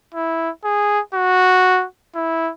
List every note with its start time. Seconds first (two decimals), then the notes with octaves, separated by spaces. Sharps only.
0.14 E4
0.64 G#4
1.14 F#4
2.15 E4